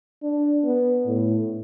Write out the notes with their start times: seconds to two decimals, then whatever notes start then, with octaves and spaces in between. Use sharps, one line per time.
0.23 D4
0.64 B3
1.06 A2